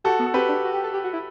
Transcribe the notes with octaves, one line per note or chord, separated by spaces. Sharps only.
F#4 G4 A4
B3
A4
C4 G4 B4
D4
F#4
G4
A4
G4
F#4
E4